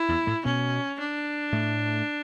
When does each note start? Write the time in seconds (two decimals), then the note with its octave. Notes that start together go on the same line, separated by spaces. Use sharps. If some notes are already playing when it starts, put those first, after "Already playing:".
Already playing: E4
0.08 E2 E3
0.27 A2 A3
0.45 B2 B3 C#4
1.00 D4
1.52 A2 A3